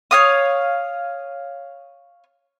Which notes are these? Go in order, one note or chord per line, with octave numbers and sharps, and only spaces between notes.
C#5 F5 D#6